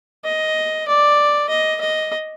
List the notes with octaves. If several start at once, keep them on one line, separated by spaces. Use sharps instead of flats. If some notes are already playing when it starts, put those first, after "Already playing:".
D#5
D5
D#5
D#5